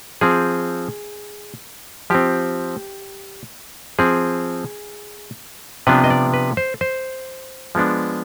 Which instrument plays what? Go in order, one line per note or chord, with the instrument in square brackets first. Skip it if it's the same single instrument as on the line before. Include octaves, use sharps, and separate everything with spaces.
[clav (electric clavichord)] F3 C4 G#4
F3 C4 G4
F3 C4 G#4
C3 F3 B3 D4 B4
D#5
D5
B4
C5
C5
F3 G#3 B3 D4